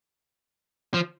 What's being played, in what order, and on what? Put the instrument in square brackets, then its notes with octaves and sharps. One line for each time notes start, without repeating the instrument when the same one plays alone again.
[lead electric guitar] F3